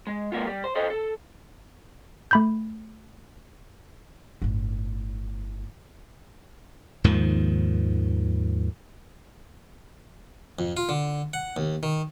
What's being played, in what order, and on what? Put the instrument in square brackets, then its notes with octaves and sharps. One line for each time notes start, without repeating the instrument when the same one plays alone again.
[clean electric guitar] G#3
G#3 A#3 B3 F4
G3
C5
A4 C5 D#5
A4
[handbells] A3 B5 G6
[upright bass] G1 A2
[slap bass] D#2 G#2 D#3 F3
[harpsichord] F2
F4
D3
F#5
D#2
D#3